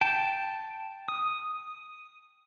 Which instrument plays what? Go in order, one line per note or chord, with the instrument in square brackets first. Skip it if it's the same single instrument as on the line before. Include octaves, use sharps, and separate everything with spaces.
[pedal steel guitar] G5 A5
D#6